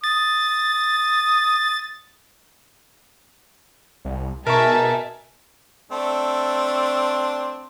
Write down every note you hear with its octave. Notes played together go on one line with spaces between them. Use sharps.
D#6 A6
C2
B2 D#4 G#4 A#4 E5 A5 C#6
A3 C4 D4